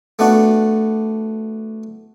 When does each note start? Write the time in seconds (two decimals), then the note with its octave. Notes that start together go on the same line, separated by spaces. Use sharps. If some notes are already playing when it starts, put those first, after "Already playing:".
0.19 A3 B3 D4 F#4